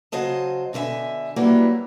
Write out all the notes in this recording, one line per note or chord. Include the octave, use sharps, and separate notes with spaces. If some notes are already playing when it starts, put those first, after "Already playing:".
C#3 F#3 C5 D#5 A5
B2 D3 B4 E5 G#5
F#3 G3 A#3 E4 B4 C#5